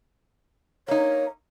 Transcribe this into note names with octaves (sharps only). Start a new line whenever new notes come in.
A#3 D#4 C#5